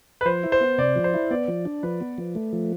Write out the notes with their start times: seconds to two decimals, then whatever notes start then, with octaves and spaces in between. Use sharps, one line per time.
0.21 B4
0.25 F3 C5
0.43 E4
0.52 C5
0.61 B3
0.78 C3 D5
0.96 F3
1.04 C5
1.14 E4
1.31 B3 D5
1.48 F3
1.65 D4
1.83 F3 B4
2.01 B3
2.18 F3
2.35 A3
2.53 F3